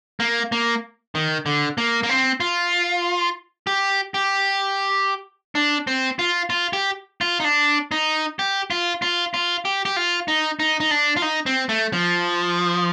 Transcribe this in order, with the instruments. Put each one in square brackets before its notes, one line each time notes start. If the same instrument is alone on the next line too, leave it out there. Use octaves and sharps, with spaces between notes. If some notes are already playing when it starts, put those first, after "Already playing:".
[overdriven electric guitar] A#3
A#3
D#3
D3
A#3
A#3
C4
F4
G4
G4
D4
C4
F4
F4
G4
F4
D#4
D4
D#4
G4
F4
F4
F4
G4
G4
F4
D#4
D#4
D#4
D4
F4
D#4
C4
A3
F3